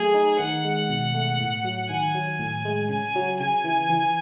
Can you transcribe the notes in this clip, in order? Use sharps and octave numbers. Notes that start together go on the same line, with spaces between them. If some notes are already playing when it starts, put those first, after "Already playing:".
Already playing: F#3 A3 G#4
D#4
D#3 F#5
G#3
B2
A3
A2
F#3
D#3 G#5
F#3
A2
G#3
C#3 G#5
F#3
C#3 G#5
E3
E3